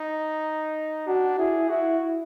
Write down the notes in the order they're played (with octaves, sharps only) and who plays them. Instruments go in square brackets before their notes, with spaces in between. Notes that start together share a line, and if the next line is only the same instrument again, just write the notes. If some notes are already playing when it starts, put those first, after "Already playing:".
Already playing: [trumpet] D#4
[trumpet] D4 [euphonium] F#4
[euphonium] E4 [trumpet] G#4
[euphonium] E4 [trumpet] F#4